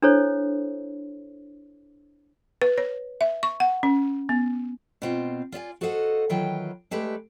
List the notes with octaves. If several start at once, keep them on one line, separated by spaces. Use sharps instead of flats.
D4 E4 A4 C5 C#5
B4
C#5
E5
C#6
F#5
C#4
B3
B2 C4 F4
F4 D5 E5 G#5
F#4 A4 C5 D#5 F5 F#5
D#3 E3 F#3 F4 B4 G5
G#3 A3 G4 B4 D5